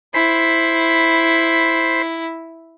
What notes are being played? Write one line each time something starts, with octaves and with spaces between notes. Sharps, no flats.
E4 C5 B5